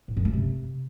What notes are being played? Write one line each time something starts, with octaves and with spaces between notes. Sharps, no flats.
A2
F#2
A3
C3